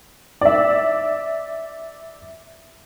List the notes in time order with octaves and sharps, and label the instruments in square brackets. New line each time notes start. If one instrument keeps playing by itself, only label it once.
[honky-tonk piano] D5 E5